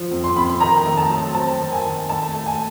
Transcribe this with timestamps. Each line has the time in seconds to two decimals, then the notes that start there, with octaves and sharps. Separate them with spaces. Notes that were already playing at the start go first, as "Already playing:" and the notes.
Already playing: F3
0.11 F2
0.24 C6
0.36 F2 B5
0.61 D#3 A#5
0.86 A3
0.97 A5
1.10 F#3
1.35 C4 A5
1.60 D#3
1.72 G#5
1.84 D#3
2.09 A3 A5
2.34 A3
2.46 G#5